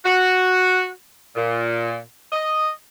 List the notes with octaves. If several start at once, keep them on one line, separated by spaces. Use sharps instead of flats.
F#4
A#2
D#5